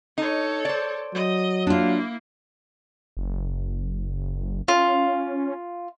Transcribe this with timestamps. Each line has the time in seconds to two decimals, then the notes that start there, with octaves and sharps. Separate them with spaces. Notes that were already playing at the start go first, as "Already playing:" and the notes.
0.18 D#4 A4 C#5
0.65 C5 D5
1.14 F#3 D#5
1.67 A#3 D4 E4 F4
3.17 F#1
4.68 C#4 F4